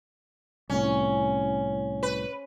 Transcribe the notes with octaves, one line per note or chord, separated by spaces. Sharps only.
C2 A2 C#4
B4